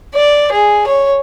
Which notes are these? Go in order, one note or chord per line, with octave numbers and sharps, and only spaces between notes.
D5
G#4
C#5